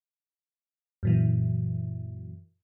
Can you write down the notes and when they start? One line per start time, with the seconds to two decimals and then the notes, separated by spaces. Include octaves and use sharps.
1.03 F#2 A#2 E3